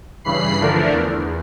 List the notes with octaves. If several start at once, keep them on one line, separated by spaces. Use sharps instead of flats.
G2 C#3 E3 B5 C7
D3 E3 F3 A3 D4 A#4
E2